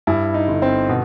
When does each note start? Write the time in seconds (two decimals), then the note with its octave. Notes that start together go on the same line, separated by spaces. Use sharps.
0.07 G2 E4
0.34 D#4
0.48 G1
0.62 C4
0.89 B2